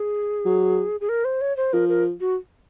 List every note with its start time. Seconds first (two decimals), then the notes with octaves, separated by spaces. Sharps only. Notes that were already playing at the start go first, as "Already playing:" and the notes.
Already playing: G#4
0.45 F#3
1.01 G#4
1.09 A#4
1.25 C5
1.41 C#5
1.57 C5
1.73 F3 A#4
1.89 A#4
2.21 F#4